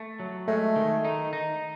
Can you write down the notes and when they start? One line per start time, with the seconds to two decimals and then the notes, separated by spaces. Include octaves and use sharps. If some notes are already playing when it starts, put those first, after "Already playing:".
Already playing: A3
0.20 F#3
0.48 G#3 A3
0.76 D#3
1.05 D#4
1.33 D#4